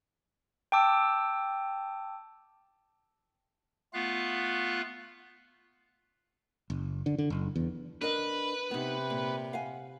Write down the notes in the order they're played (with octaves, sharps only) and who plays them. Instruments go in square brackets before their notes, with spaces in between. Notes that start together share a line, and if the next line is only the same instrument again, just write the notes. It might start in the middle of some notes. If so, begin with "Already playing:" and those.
[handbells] G5 A5 D6 E6
[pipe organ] A3 B3 F4 F5 F#6
[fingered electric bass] F#1
D3
D3
F#1
E2
[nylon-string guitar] D4 A#4 D#5 [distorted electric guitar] B4
[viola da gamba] C3 [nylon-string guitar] B3 D#4
[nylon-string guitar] A#2
F5 F#5 G#5